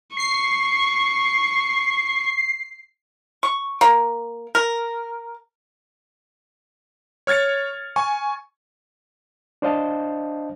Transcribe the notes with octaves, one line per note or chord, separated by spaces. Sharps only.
C#6 C7
C#6
A#3
A#4
C#5 F6 G#6 A6 C#7
G#5 C#6
D4 C5 D#5 F5 A5